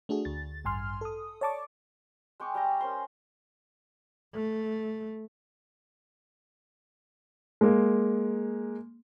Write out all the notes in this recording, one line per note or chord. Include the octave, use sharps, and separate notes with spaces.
A3 D4 F#4 G#4
D2 A6
A1 G2 G#5 C6 F6
A4 D#6
C#5 D5 A5 C#6 D6
G#3 G5 C#6 D6
G3 G5 A#5
C#4 A#4 C5 C6
A3
G#3 A#3